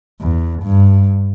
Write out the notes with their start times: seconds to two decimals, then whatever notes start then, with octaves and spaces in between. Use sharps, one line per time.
0.21 E2
0.63 G2